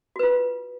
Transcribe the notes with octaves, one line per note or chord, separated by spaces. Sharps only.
F4 F#4 B4